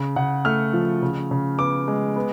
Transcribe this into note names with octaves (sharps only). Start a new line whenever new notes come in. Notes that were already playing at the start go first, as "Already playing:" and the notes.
Already playing: C#3
C#3 F#5
A3 F6
F3
C#3
C#3
B3 D6
G#3
B3